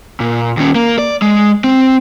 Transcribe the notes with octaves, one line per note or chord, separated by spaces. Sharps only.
A#2
D#2 C#4
A#3
D5
G#3
C4